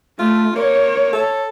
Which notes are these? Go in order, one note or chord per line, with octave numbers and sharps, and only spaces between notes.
A3 F4
A#3 C#5
A4